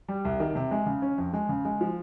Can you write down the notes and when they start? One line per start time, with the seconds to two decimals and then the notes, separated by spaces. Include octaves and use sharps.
0.08 G3
0.25 C2
0.40 D#3
0.55 C3
0.71 G#3
0.86 C#3
1.02 C#4
1.18 F2
1.33 G#3
1.49 C#3
1.65 G#3
1.81 F3